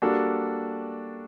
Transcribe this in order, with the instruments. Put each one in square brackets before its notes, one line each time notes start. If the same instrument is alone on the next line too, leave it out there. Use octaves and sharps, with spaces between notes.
[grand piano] G3 A#3 D4 F#4 A4